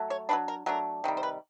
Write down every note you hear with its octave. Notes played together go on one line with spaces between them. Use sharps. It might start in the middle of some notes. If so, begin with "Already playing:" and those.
Already playing: F#3 A3
C#5
F#3 A3 D4 B4
A#4
F#3 A3 D4 A#4
C3 D#3 G3
C5
B4